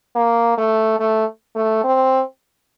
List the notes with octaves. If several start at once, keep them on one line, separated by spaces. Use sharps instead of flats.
A#3
A3
A3
A3
C4